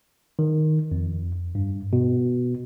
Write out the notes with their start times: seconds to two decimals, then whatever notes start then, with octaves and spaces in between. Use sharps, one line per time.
0.39 D#3
0.92 F2
1.55 G2
1.93 B2